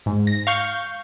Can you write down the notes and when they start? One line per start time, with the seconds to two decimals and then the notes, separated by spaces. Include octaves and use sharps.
0.06 G#2
0.27 A#6
0.47 F5 C#6 G6